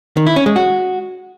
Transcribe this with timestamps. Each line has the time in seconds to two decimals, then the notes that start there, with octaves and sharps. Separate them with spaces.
0.17 D#3
0.26 E4
0.36 C#4
0.46 G#3
0.56 F#4